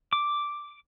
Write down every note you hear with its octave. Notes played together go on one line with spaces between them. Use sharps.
D6